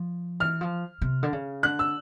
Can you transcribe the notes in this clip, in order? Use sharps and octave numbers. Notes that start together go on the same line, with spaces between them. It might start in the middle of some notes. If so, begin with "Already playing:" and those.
Already playing: F3
E3 F6
F3
C3
D3
C#3
D3 F#6
E6